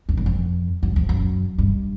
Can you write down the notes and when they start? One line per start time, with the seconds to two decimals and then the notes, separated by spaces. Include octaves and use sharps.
0.09 F2
0.17 F#2
0.26 F2
0.83 F#2
0.96 F2
1.09 F#2
1.58 G2